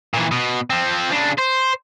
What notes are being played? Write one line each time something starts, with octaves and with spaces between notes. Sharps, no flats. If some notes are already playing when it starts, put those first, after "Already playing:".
A#2 E3
B2
F3 C4
C#3 D4
C5